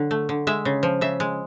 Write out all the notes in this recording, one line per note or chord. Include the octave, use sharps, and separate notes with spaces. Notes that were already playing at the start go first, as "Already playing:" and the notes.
Already playing: D3 F#3
A3
D3
G#3 E5
C#3
F3
C#3 E5
G#3